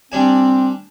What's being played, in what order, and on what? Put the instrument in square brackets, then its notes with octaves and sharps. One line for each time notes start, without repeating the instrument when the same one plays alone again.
[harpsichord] G3 D4 G#5 [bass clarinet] C4